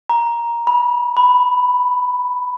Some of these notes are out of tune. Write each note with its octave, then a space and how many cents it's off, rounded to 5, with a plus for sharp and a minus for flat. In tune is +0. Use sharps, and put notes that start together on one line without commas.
A#5 +10
B5 -25
B5 +5